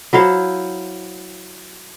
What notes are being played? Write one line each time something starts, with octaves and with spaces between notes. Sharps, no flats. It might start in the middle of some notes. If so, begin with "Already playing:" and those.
F#3 E4 C5 F5